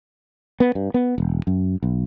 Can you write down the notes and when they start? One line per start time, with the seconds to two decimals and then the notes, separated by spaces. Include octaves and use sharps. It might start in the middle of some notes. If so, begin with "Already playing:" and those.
0.60 B3
0.75 G2
0.94 B3
1.18 E1
1.47 F#2
1.83 B1